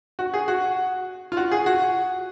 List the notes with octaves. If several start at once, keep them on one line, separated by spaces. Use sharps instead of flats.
F#4
G#4
F#4
F4
F#4
G#4
F#4